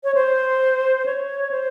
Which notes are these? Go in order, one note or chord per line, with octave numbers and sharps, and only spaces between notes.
C#5
C5
C#5
C5